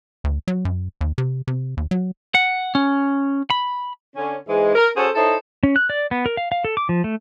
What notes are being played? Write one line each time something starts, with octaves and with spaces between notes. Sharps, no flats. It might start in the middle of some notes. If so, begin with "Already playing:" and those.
D2
F#3
F#2
D#2
C3
C3
D#2
F#3
F#5
C#4
B5
D3 C#4
G#2 E3 G#3
A#4
C#4 F#4 G#4 A4 C5
D#4 E4 A4 C5 C#5
C#4
F#6
D5
B3
A#4
F5
F5
A4
D6
F3
A3